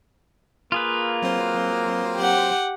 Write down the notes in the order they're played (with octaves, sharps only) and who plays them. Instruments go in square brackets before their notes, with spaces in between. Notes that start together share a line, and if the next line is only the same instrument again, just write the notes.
[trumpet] A#3 [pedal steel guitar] F4 G#4 B4
[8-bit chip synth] F#3 C4 C5
[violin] G4 F#5